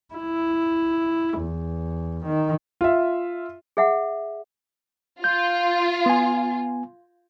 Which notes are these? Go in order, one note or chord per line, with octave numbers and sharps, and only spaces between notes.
E4
E2
D#3
F4 E5
G#4 E5 F#5
F4 G6
B3 G#5